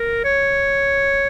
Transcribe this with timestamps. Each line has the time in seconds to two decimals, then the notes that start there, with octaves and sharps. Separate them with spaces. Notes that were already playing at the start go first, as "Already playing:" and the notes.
Already playing: A#4
0.24 C#5